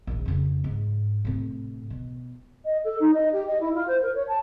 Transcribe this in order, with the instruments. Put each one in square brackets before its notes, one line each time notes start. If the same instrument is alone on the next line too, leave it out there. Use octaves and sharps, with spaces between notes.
[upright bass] A#1 D#3
F2 C#3
G#2
A2 C3
B2
[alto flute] D#5
A4
D#4
D#5
G4
D#5
E4
F4
C5
A#4
C#5
A5